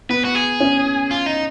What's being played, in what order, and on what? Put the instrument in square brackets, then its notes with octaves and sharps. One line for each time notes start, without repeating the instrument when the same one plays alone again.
[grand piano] B3 [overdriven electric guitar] B4
[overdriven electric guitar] F#4
G#4
[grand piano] C#4
[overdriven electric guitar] F4
D#4